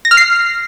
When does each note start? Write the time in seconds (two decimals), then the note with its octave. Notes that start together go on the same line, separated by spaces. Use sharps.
0.05 A#6
0.11 F6
0.17 C7